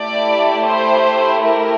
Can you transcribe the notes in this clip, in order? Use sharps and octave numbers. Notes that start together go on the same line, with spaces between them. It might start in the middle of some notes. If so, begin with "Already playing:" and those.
Already playing: A3 E4 G4 D5
C5
A#4